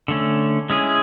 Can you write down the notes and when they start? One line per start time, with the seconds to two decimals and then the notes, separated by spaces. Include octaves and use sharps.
0.08 D3 A3 C#4
0.70 G#3 C#4 E4 G#4